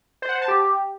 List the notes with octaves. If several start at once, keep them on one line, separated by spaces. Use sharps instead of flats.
C5
F#5
C5
A5
G4